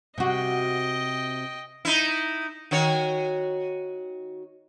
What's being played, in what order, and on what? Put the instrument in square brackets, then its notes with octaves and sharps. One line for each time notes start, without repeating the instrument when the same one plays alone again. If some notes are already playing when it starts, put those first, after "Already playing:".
[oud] C3 F#4 [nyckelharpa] D#5 G5
[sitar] D#4 E4
D#3 F#4 C#5